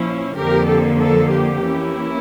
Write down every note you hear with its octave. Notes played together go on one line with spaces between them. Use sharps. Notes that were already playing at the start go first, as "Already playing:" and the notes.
Already playing: A#2 F3 C#4 E4
F2 D3 F3 A#3 G4 A#4
A4
A4
G4
E3 A#3 C#4 E4